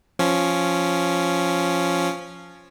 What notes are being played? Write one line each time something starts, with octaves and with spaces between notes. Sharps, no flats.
F3 C#4